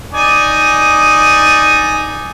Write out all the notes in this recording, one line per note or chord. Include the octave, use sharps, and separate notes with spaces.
D#4 D5 G#5